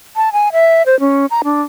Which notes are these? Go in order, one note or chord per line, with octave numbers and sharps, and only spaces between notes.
A5
G#5
E5
C5
C#4
A#5
D4